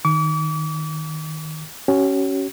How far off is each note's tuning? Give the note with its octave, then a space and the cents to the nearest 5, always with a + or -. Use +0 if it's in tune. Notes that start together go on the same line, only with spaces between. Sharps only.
D#3 +0 D6 -40
C#4 +0 F#4 +45